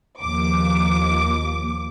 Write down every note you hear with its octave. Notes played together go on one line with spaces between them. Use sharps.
D#2 F3 D6